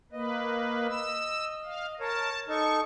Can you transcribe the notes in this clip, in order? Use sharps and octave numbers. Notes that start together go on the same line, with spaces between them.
A#3 B4 D#5
E6
F5
A#4 C#5 A5
D#4 A4 A5 C#6